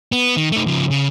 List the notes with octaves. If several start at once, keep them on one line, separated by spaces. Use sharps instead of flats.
B3
D#3
A3 D#4
C#3 F3
C#3